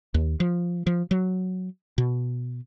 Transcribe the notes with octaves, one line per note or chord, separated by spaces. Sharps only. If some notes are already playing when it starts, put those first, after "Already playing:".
D#2
F3
F3
F#3
B2